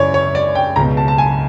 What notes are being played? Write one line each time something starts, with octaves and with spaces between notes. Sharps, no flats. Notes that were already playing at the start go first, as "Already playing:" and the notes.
Already playing: F#2 C#3 E3 C#5 D5
C#5
D5
G5
C#2 B2 A#5
A5
A5
G#5